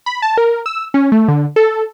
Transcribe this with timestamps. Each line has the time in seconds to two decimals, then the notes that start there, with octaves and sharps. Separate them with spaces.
0.06 B5
0.22 A5
0.38 A#4
0.66 E6
0.94 C#4
1.12 A3
1.28 D3
1.56 A4